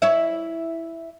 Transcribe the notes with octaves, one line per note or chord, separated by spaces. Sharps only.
E4 C#5 E5